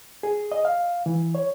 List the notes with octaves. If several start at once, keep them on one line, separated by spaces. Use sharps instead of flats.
G#4
D#5
F5
E3
C#5